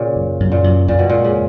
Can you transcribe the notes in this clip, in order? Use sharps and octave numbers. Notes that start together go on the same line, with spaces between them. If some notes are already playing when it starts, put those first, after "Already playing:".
Already playing: A#2 C#3
F#2
F#2
A#2
F#2
F2 A#2
B2
A#2 G#3
C#3